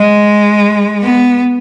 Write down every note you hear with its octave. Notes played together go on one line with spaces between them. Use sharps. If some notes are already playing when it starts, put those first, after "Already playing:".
Already playing: G#3 D#5
B3